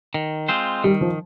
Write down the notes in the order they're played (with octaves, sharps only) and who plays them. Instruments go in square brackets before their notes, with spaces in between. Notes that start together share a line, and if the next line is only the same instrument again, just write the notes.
[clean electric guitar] D#3
G#3 C4 F4 C5
[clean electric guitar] D#3 [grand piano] G3
[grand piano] F3